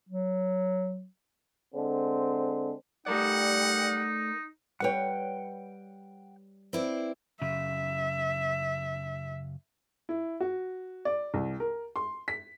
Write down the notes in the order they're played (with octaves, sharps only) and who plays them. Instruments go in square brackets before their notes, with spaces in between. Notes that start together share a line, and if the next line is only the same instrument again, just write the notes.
[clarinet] F#3
[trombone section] D3 G#3 C4
[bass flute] G3 [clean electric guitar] A3 A#4 D5 [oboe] D#4 [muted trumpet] F#5
[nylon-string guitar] G3 B4 C#5 [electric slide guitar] F#5 G5
[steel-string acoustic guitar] C4 E4 D5 [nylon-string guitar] B4
[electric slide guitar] F#2 C#3 [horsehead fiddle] E5
[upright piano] E4
F#4
D5
C2
A#4
C6
B6